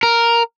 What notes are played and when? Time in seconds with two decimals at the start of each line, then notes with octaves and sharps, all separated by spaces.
0.03 A#4